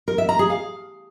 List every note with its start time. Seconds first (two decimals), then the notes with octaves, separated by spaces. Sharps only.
0.08 A#4
0.18 E5
0.29 A#5
0.39 G#4
0.50 F5